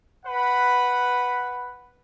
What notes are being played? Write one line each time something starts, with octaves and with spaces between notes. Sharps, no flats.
B4 F#5 B5